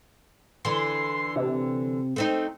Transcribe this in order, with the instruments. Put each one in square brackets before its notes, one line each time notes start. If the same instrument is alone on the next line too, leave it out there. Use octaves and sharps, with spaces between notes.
[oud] D3 E3 [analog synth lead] C6
[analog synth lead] C3
[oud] A3 C4 D#4